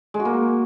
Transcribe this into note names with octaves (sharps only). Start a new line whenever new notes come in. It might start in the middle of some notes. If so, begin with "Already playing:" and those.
G#3
F#4
A#3